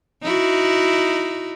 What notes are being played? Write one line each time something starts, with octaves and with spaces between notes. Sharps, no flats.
D#4 E4 F#4